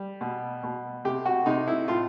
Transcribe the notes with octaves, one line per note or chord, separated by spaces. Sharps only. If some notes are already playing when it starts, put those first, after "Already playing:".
Already playing: G3
B2
B2
C3 G4
F#4
C3 D#4
E4
A2 F4